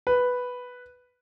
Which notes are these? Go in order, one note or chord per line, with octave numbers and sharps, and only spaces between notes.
B4